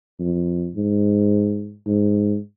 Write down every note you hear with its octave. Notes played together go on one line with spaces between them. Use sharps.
F2
G#2
G#2